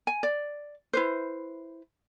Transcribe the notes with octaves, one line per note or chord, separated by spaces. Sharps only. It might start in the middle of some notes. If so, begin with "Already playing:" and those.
G#5
D5
E4 B4 C5